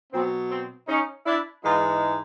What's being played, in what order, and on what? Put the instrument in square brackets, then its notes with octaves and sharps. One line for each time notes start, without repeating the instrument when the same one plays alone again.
[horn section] B2 F#3 C4
C4
C#4 D#4
D4 E4
G#2 E3 G#3 D#4 F4